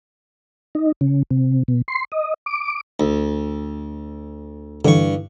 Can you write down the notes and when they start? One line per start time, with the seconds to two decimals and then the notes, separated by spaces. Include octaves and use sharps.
0.75 D#4
1.01 C#3
1.31 C3
1.68 B2
1.88 C6
2.12 D#5
2.46 D6
3.00 D2
4.85 G2 D3 E3 C#6